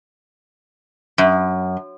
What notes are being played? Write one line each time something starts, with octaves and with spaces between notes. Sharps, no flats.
F#2